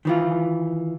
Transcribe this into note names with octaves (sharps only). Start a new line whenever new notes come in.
D#3 E3 F4